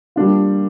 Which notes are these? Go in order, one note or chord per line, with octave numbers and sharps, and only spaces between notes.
G3 A#3 D4 F4